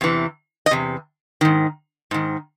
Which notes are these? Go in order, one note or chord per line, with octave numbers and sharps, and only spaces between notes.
E2 C3 E3
D#5
E2 C3
G#2 D#3
G#2 D#3